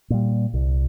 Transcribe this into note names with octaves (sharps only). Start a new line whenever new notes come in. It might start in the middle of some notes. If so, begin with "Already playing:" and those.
A#2 G3
C2